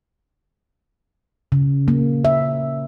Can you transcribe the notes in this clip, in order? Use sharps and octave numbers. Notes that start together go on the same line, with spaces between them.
C#3
A#3
E5